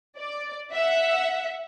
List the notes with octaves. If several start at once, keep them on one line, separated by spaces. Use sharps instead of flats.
D5
E5 F#5